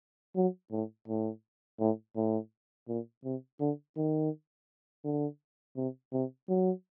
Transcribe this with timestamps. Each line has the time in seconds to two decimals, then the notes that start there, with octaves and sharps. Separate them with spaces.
0.36 F#3
0.72 A2
1.08 A2
1.79 A2
2.16 A2
2.88 A#2
3.24 C3
3.60 D3
3.97 D#3
5.04 D3
5.77 C3
6.13 C3
6.49 F#3